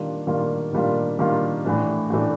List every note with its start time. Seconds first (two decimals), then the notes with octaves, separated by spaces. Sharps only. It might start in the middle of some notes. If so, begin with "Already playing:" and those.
Already playing: D#3 G3 A#3 D4 F4
0.27 D#3 G3 A#3 D4 F4
0.73 D#3 G3 A#3 D4 F4
1.19 D#3 G3 A#3 D4 F4
1.65 A2 E3 A3 D4
2.10 A2 E3 A3 D4